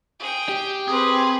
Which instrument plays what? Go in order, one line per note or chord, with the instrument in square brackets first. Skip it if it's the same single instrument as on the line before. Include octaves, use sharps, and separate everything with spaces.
[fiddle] G#4 G5
[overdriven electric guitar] G4
[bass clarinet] C4 [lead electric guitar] G#4 [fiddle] B4